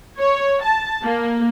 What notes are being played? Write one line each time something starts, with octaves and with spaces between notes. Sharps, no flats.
C#5
A5
A#3